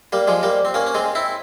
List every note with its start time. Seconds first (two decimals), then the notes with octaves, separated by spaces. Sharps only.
0.12 G3 A#3
0.28 F3 G#3
0.43 G3 A#3
0.65 C4
0.74 A#3 C#4
0.86 C#4
0.95 G#3 C4
1.15 C4 E4